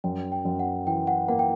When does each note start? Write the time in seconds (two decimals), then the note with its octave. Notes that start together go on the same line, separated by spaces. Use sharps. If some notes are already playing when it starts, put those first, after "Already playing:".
0.04 F#2 G5
0.32 G5
0.45 F#2
0.59 F#5
0.87 E3 G5
1.07 F#5
1.28 A#3 F#5
1.39 G5